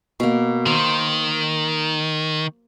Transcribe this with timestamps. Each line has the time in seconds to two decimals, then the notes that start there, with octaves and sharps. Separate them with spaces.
0.20 B2 A#3
0.66 D#3 C5